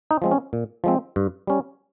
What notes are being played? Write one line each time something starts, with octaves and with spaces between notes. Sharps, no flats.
D#4
F3 G#3 C4
C#4
A#2
F3 G#3 C4
G2
G3 C#4